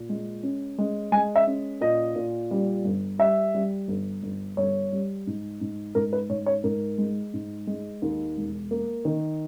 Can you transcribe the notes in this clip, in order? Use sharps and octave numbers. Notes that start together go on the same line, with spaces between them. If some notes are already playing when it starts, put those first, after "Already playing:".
Already playing: A#2
G#3
C#4
G#3
G#3 G#5
E5
C#4
A#2 D#5
A#2
G3
G1
G3 E5
G3
G1
G1
G1 C#5
G3
G#2
G#2
G#2 A#4
B4
G#2 C#5
C#5
G#2 A#4
G#3
G#2
G#3
D#2
E1
A#3
D#3